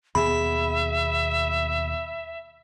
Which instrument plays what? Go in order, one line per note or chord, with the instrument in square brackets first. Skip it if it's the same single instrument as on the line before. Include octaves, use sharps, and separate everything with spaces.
[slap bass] D#2 B2 B3 [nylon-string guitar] G#4 [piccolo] E5 [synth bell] B5